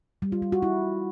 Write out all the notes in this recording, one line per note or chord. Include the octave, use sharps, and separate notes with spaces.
G3
F4
G3
F#4
E4